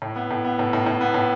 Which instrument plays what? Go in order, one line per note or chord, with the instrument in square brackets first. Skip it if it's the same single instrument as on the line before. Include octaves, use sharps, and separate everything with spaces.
[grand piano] A2
B3
A2
B3
A2
A2
A2
B3
A2